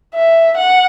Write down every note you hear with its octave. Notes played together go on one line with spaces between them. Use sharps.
E5
F#5